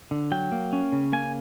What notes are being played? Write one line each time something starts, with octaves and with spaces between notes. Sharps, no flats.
D3
F#3 G5
A#3
C#4
C#3
A#3 G#5